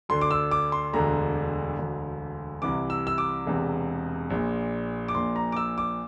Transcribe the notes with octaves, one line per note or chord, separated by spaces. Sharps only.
D2 D3 C6
D6
E6
D6
C6
E1 D2 D3 A#5
E1 D2 D3
C2 C3 E3 D6
E6
E6
D6
E1 E2 C3
A#1 A#2
D6
A#1 A#2 C6
A#5
D6
E6
D6